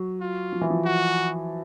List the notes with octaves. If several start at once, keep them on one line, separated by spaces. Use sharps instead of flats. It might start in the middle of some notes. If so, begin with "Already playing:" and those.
Already playing: F#3
F4
F3
E3
F3
F#4